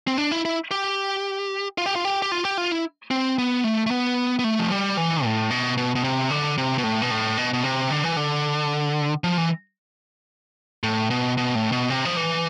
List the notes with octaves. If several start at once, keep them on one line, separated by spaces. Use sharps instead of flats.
C4
D4
E4
E4
G4
F4
G4
F4
G4
G4
F4
G4
F4
E4
C4
B3
A3
A3
B3
B3
A3
F3
G3
E3
A2
B2
B2
B2
C3
D3
C3
B2
A2
B2
A2
B2
B2
C3
D3
E3
D3
F3
E3
A2
B2
B2
A2
B2
C3
F3
E3